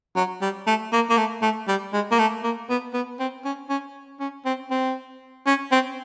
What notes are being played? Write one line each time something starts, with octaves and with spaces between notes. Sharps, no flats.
F#3
G3
A3
A#3
A#3
A3
A3
G3
G#3
A#3
A3
A#3
B3
B3
C4
C#4
C#4
C#4
C4
C4
C#4
C4